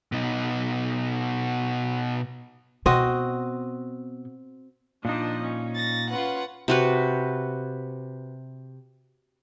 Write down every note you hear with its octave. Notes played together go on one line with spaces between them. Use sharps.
B2 D#4
B2 C4 F#4 D#5
A#2 F3 D4 D#4 D#5
C#4
A6 A#6
C#4 F4 B4 F#5
C3 F#4 B4